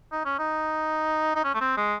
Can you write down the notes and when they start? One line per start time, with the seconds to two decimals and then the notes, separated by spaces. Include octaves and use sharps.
0.12 D#4
0.25 C#4
0.39 D#4
1.35 D#4
1.44 C#4
1.55 A3
1.61 C4
1.77 G#3